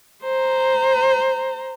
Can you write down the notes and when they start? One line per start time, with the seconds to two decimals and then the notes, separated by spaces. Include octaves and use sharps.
0.23 C5 A#5